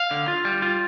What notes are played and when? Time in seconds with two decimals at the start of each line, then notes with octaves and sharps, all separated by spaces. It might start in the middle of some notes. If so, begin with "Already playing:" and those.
Already playing: F5
0.11 D3
0.28 F4
0.45 G3
0.62 F4